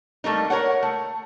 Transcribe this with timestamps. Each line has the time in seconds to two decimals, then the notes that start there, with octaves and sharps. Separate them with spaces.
0.24 G3 A3 A#3 D#4
0.50 A#4 C5 C#5 F#5
0.83 A3